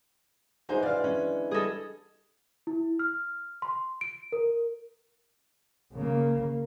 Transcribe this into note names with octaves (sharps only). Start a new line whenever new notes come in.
D3 E3 G#3 D#4 G#4 C5
D5 F5
C#4
G3 G#4 A4 D#5
E4
F6
C6
D7
A#4
C#3 A#3